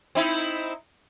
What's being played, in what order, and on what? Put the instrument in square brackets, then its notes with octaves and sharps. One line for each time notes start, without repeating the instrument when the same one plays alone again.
[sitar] C4 D#4 E4